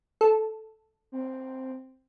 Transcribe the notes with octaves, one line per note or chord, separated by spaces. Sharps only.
A4
C4